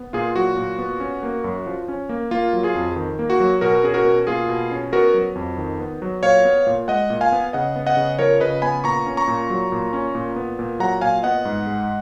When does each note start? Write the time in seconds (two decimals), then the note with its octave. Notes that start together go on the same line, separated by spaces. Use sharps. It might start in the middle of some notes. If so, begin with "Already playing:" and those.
Already playing: B3
0.13 A#2 F4 G#4
0.36 F#3 F#4
0.57 A#2
0.78 B3
1.00 C#4
1.23 A#3
1.44 F#2
1.67 F3
1.88 C#4
2.09 A#3
2.31 A#3 F4
2.53 F#3
2.63 F4 G#4
2.75 F2
2.96 D#3
3.19 A#3
3.30 F#4
3.40 F#3
3.61 B2 F#4 A#4
3.83 C#4 G#4
3.94 F#4 A#4
4.05 B2
4.27 A#3 F4 G#4
4.49 B2
4.71 C#4
4.92 B3 F#4 A#4
5.14 F#3
5.35 F2
5.58 D#3
5.79 B3
6.02 F#3
6.23 A#2 C#5 F5
6.45 B3
6.67 A#2
6.88 G#3 D#5 F#5
7.10 A#2
7.21 F5 G#5
7.32 B3
7.53 C#3 D#5 F#5
7.76 B3
7.87 D#5 F#5
7.97 C#3
8.18 F3 A#4 C#5
8.40 C#3 B4 D#5
8.62 B3 G#5 B5
8.84 A#2 A#5 C#6
9.06 C#4
9.17 A#5 C#6
9.28 A#2
9.50 F#3
9.72 A#2
9.93 C#4
10.15 A#2
10.36 B3
10.59 A#2
10.80 F#3 F#5 A#5
11.01 A#2 F5 G#5
11.23 B3 D#5 F#5
11.45 G#2
11.67 G#3